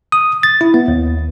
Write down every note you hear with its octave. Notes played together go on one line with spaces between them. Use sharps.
D#6
A6
E4
B3
D#2